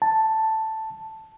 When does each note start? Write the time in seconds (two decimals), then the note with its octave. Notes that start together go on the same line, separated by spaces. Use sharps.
0.02 A5